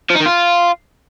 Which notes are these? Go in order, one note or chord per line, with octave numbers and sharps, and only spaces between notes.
F3
D#4
D#3
F4